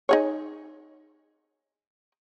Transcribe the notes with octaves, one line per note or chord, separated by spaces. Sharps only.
D#4 G#4 C#5